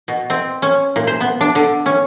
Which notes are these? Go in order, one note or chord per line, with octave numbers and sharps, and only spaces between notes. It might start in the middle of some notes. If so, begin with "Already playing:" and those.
B2
C4
C#4
A#2
C5
B3
D4
D3
C#4